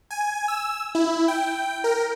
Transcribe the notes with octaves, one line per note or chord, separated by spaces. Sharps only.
G#5
E6
E4
G5
A#4